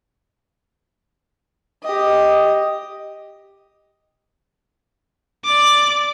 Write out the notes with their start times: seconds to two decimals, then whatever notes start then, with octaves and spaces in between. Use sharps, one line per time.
1.83 G4 D#5
5.45 D5 D6